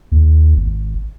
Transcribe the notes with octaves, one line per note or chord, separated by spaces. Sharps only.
D#2
G#1